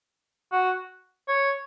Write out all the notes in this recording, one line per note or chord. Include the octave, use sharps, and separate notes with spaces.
F#4
C#5